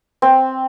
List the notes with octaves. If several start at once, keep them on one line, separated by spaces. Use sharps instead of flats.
C4